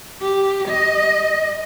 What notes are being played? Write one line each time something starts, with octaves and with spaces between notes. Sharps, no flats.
G4
D#5